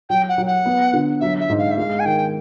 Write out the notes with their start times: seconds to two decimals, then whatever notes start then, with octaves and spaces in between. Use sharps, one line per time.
0.10 F#3 G5
0.29 F#5
0.38 F#3
0.47 F#5
0.66 B3
0.93 D3
1.21 F#3 E5
1.40 E5
1.49 G#2
1.58 F5
1.71 E5
1.78 G#3 F5
2.00 G#5
2.05 D#3 G5